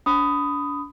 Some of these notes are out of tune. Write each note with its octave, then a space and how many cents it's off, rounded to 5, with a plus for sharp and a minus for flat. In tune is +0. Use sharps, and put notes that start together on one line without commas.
D4 -35 B5 +20 D#6 +0